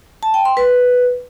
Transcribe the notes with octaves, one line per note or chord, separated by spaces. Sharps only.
A5
G5
C6
B4